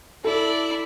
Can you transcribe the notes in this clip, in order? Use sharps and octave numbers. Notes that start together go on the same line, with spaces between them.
E4 A4 D5